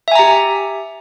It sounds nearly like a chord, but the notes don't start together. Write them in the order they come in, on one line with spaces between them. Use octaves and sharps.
E5 G#5 A#5 G4